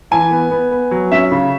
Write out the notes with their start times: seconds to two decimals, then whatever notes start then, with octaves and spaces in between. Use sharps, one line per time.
0.11 E3 G#5
0.31 B3
0.51 B3
0.71 B3
0.91 F#3
1.12 C#4 E5
1.32 C#3